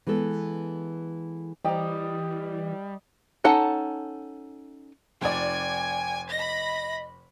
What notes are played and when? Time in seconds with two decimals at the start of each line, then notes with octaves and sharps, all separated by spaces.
0.07 E3 G#3 B3 A4
1.64 E3 G3 D#5 G5 A#5
3.44 C#4 D#4 A4 F#5 A5
5.22 F1 D5 G5 G#5
6.32 D#5 B5 A#6